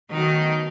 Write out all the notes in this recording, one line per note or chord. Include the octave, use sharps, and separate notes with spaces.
B2 D#3 F#3 A3 D#4